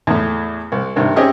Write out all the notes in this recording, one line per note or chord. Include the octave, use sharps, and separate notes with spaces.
E2 A2
C2
C2 G2 C3 D#3
C4 C#4 G4 G#4 D#5 E5